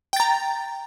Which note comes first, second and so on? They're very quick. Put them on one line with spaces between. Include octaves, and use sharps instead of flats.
G5 A6 A#5